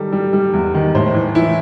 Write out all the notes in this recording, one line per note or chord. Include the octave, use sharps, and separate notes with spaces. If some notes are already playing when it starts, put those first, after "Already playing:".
Already playing: D#3 G3 A4
G3
G3
E2
D#3
A2 C5
E3
E3 E4